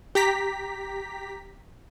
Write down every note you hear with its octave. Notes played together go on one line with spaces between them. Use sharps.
G4 A#5 B6